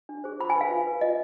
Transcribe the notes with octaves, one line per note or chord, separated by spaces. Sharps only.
D4
G#4 C5
F4 B5
G#5
B4
F5
F4
B4
F4 D#5